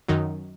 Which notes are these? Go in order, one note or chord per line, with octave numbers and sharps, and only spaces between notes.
F#2 D#3 F#3 D#4